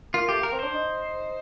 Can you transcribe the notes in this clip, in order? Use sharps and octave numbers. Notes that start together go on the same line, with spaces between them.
A#3 F4
A3 G4
A#3 A#4
C4
D4 C5
D#4